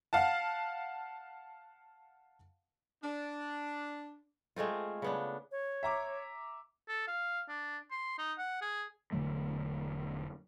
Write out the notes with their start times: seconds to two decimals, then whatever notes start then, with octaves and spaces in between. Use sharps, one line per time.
0.13 F5 F#5 A5
3.04 D4
4.56 G#3 A3 C4 F4
5.02 C#3 B3 D4
5.52 C#5
5.83 E5 A#5 D6
6.88 A4
7.08 F5
7.49 D4
7.91 C6
8.19 D#4
8.38 F#5
8.62 G#4
9.12 E1 D3 F#3 A3